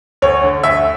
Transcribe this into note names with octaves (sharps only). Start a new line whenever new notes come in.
D2 C#5
D3
D2 E5